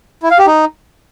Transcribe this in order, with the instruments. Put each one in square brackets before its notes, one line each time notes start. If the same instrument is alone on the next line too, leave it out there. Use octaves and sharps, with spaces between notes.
[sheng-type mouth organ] E4
F5
G4
D#4